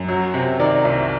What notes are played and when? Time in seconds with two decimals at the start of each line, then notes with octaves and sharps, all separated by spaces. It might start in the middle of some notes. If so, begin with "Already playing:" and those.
Already playing: F#2
0.08 F#3
0.34 C3
0.59 D#3 D5
0.85 C2